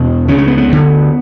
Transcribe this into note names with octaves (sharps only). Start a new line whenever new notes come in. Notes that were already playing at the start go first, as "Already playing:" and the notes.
Already playing: E2 B2
C#2 C#3 C#4
C#4
B3
B3
D2 D3